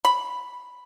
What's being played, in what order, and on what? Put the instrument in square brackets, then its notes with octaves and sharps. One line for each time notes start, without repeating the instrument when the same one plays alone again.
[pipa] B5